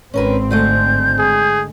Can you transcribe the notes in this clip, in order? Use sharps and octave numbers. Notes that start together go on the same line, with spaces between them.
G#1 C4 C#4 A#4 B4
D3 G#3 A3 G6
G#4